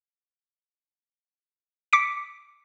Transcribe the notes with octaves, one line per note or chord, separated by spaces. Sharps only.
D6 B6 C#7 D7